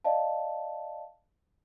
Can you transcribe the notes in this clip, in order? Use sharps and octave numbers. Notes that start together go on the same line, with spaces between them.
D5 D#5 F5 A5